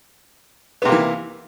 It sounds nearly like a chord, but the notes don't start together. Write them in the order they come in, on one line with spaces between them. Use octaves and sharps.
B3 C3 A#3 E3